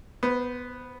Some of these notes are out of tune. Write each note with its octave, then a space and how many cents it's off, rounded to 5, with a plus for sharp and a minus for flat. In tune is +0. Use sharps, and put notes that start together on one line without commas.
B3 +0 C5 -25